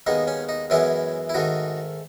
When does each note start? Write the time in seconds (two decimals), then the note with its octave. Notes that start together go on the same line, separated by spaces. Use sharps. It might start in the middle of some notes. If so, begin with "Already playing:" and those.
0.07 D#2 D#3 G#3 B3 D#4
0.28 C#4
0.49 D#4
0.70 F#2 E3 G#3 B3 C#4 E4
1.29 E4
1.34 G#2 D#3 A3 D#4 F#4